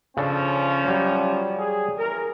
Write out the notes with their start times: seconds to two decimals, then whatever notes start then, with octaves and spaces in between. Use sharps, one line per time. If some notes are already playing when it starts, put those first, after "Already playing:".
0.17 C#3 F3 C#4 D4 A4
0.88 F#3 G3
1.58 G#4
1.97 E2 A#4